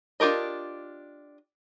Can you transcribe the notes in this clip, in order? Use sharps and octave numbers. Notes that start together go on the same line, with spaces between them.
D4 F4 G4 A#4 D#5